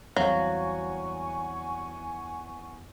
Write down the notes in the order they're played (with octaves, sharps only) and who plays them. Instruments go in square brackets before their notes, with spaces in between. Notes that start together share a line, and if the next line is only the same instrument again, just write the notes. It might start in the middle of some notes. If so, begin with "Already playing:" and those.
[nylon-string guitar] E2 G3 C4 [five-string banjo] F#3 [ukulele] F5 [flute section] F#5 G#5 C#6